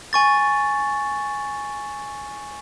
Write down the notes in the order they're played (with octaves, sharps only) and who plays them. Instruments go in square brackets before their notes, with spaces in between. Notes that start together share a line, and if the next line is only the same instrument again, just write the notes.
[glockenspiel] G#5 C#6 A6